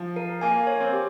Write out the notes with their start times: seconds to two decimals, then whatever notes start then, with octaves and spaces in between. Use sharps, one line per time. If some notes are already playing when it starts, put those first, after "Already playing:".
Already playing: F3
0.16 A#4
0.41 A#3 G#5
0.67 C#5
0.80 C4
0.93 G4